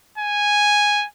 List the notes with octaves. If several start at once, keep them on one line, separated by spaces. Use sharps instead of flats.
G#5